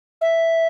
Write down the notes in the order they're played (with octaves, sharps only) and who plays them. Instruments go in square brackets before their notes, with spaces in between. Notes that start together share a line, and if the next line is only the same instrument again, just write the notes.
[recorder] E5